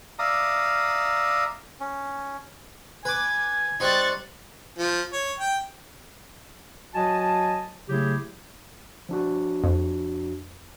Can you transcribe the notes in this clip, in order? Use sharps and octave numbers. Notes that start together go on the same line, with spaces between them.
D5 E5 F5 A#5 D#6
C#4
B4 G#5 D6
G3 C4 D#4 C#6 F#6 A6
F3
C#5
G5
F#3 F#4 D#5 G#5 A5
C#3 F#3 A3 E4 G4 G#4
F3 D4 F#4
F2